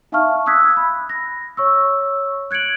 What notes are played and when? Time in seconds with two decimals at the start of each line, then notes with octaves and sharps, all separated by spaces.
0.12 D#4 E5 F5 A5 C#6 F6
0.46 D#6 E6 F#6 G#6 B6
0.77 B5
1.09 A#6
1.57 C#5 C#6 E6
2.51 F#6 G#6 C#7 D7 F#7